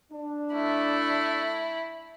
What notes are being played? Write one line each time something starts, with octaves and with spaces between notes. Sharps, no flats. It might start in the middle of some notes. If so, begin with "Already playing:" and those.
D4
A3 E4